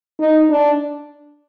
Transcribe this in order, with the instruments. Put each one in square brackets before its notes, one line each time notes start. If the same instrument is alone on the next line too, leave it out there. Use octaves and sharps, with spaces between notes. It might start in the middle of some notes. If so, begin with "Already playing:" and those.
[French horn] D#4
D4